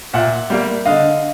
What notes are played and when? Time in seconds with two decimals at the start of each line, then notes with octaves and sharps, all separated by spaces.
0.13 A#2 E5 F#5
0.50 G3 A#3
0.85 D3 D#5 F5